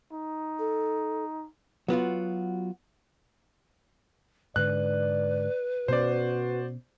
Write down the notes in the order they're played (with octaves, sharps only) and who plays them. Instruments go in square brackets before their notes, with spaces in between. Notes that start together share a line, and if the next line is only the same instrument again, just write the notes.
[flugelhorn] D#4
[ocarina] A4
[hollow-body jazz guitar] F#3 B3 F4 F#4
[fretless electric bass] G#2 D3 [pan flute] B4 [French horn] D5 [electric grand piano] F#6
[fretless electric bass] B2 B3 C#4 [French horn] F#4 [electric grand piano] C5 D5